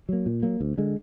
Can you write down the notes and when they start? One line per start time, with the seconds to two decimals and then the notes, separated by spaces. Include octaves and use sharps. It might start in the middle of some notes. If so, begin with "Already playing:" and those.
0.09 F#3 A#3
0.26 A#2
0.43 F#3 A#3
0.61 D2
0.78 D3 G#3